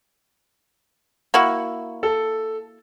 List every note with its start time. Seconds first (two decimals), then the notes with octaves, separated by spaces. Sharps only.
1.34 A#3 E4 F#4
2.03 A4